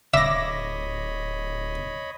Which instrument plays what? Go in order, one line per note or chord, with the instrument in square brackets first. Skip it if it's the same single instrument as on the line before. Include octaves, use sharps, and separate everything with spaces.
[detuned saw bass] D1 [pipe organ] C#5 D#5 B5 [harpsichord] E5 [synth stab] D6 A#6